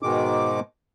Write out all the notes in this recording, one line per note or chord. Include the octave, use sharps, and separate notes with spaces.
G#2 B2 D#3 G#3 D6